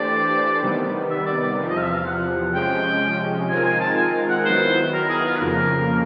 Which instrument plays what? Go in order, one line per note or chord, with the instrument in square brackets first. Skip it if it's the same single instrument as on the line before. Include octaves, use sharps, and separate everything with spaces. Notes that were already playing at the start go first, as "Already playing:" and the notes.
Already playing: [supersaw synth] E3 A3 D4 G4 C5 [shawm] D5
[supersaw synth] C3 D#3 G3 B3
[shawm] E5
D5
D5
[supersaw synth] E2 C3 F3
[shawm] D#5
F5
E5
F5
F#5
[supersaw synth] C3 F3 G#3 C#4 [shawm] G5
[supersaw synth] D#3 G#3 C4 F4 A#4 [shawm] G#5
[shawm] G#5
A5
G#5
F#5
[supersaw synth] D#3 F#3 B3 E4 [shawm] C5
[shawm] A#4
G#4
F4
B4
[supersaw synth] F2 C#3 F3 A#3 [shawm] A#4